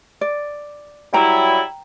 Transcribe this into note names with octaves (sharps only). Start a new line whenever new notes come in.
D5
F#3 G3 E4 G5 A#5